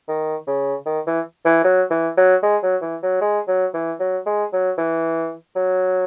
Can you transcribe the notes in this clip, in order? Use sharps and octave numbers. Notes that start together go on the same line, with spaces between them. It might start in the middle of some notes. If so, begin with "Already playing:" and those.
D#3
C#3
D#3
E3
E3
F#3
E3
F#3
G#3
F#3
E3
F#3
G#3
F#3
E3
F#3
G#3
F#3
E3
F#3